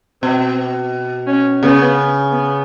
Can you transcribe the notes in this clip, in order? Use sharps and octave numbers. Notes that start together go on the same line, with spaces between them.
B2 C4
C#4
C#3 B3
B3